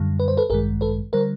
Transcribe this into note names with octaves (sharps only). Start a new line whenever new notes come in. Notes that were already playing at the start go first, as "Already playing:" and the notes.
Already playing: F#2 D3 G3
B4
C5
A4 B4
A1 G2 D#3 G#3 G#4 A#4
A4 B4
D3 G3 A#4 C5